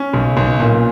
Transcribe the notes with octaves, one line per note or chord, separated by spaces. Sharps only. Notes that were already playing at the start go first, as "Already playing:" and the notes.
Already playing: C#4
B1
B1
A#2